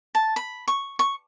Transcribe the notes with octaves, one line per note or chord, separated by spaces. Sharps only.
A5
B5
C#6
C#6